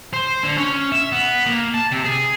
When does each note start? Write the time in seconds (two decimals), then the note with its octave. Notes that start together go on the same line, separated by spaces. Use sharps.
0.13 C5
0.43 D3
0.57 C#4
0.92 E5
1.12 B3
1.47 A#3
1.74 A5
1.92 C3
2.04 G#4